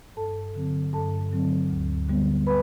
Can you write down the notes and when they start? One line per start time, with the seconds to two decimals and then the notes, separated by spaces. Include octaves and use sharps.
0.17 G2 A4 A5
0.55 D3 F#3 C4
0.93 G2 A4 A5
1.32 D3 F#3 C4
1.70 D2
2.08 D3 G3 B3
2.47 B4 B5